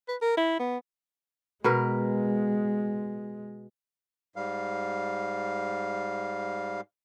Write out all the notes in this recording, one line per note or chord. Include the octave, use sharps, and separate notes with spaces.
B4
A#4
E4
B3
B2 G#3 A#4 B4
G#2 G3 F5